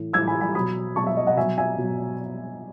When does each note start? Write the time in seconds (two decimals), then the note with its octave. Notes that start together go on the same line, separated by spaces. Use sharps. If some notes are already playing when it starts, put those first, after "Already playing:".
Already playing: A2 E3
0.13 A2 E3 E6 G#6
0.27 G#5 B5
0.41 G#5 B5
0.55 B2 F#3 B5 D#6
0.96 B2 F#3 A5 C#6
1.07 E5
1.17 D#5
1.27 D#5 F#5
1.37 B2 F#3 E5 G#5
1.58 E5 G#5
1.78 B2 F#3